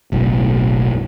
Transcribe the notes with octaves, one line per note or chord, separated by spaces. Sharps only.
F#1 B1 A2